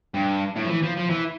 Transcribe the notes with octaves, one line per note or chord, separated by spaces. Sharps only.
G2
A2
F3
E3
F3
F3
E3